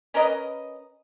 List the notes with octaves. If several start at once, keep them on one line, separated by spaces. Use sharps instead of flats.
C#4 A#4 B4 D#5